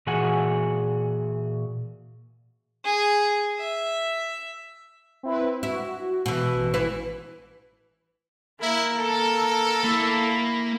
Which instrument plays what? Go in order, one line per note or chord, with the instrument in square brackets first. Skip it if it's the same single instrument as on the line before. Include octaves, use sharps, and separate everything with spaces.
[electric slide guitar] A#2 E3 F#4 G#4 F#5 G#5
[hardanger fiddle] G#4
E5
[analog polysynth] C4 E4 B4
[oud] E4 [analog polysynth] F#4
[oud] B2 E3
[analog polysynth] A1
[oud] E3 E4 B4
[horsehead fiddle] A#3 A#4 [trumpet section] E4
[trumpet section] A4
[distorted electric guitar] A#3 [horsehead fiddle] E4 B5